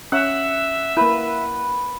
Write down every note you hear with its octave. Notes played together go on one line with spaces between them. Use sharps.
C#4 E5 F#5
A#3 E4 B4